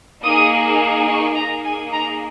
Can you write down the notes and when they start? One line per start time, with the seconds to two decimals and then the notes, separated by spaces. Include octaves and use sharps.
0.24 A#3 D#4 G#4 D#6
1.08 C#6
1.36 A#3 D#4 G#4 A#5
1.64 G#5
1.93 A#5